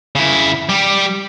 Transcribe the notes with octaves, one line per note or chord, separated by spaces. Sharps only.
C#3 E4
G3 G4